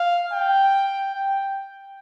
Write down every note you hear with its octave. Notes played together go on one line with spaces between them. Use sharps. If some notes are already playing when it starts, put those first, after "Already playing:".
Already playing: F5
G5
G5